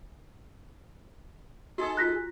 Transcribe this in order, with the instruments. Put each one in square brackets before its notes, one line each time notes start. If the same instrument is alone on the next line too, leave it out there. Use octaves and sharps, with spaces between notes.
[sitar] D#4 G#4 A4 [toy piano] F#4
[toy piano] F4 A#5 [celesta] F#6 A#6 B6